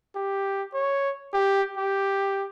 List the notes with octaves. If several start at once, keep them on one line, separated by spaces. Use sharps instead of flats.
G4
C#5
G4
G4